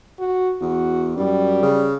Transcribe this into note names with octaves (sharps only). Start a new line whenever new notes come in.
F#4
E2 F#4
F#2 G3
C#3